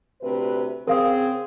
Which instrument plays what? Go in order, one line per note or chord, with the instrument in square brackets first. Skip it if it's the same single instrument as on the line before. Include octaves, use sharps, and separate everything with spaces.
[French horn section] D2 C3 B4
[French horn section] C#3 C4 G#4 [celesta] A#4 F5 D#6